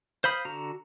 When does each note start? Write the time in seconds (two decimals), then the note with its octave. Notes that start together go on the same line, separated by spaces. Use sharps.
0.24 C5 F5 B5 D#6
0.45 D3 F#4 A#5